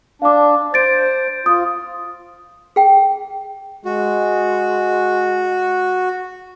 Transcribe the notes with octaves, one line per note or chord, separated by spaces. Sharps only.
D4 F5 D6
C5 A6 D7
F4 D#6
G#4 G5
G#3 F#4